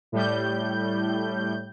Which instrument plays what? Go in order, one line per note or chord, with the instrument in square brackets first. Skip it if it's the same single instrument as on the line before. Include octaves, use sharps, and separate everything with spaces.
[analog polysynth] A2 G3 G6